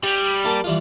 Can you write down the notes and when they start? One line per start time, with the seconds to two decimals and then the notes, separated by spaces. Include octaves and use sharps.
0.04 G3
0.45 A#3 A5
0.64 E3 G3 F4